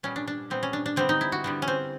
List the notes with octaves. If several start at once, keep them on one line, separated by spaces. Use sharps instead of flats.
A#2 G3 B3 C#4
D4
D4
A#2 G3 B3 C4
C#4
D4
D4
D3 G3 B3 C4
D#4
E4
F#4
D3 G3 B3
C#4
C4